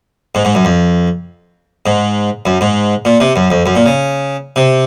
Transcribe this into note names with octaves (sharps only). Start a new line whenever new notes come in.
G#2
G#2
F#2
F2
G#2
F#2
G#2
A#2
C3
F#2
F2
F#2
A#2
C#3
C3